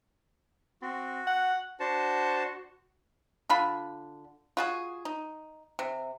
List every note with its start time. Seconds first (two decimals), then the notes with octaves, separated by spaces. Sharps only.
0.82 C4 F#4
1.27 F#5
1.80 D4 F#4 C5 A5
3.50 D3 F4 B5
4.57 F4 F#4 G#4
5.05 D#4
5.79 C3